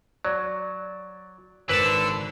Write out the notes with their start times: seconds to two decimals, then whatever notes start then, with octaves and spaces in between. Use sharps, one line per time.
0.25 F#3 D5
1.69 G#1 D3 B4 A5 E6